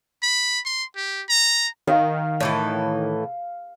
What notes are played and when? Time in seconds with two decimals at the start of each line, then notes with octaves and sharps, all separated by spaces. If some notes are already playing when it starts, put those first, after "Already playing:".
0.23 B5
0.65 C6
0.96 G4
1.29 A#5
1.87 D#3 F5
2.40 A2 E3 A4